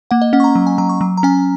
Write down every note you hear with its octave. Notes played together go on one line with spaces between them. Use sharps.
A#3 F#5
D#5
C#4 F#5
C#6
A#5
F#3
G#5
F#3 A#5
C#6
F#3
A#5
C#4 G#5